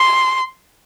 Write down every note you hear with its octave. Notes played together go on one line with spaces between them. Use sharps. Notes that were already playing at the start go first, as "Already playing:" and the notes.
Already playing: C6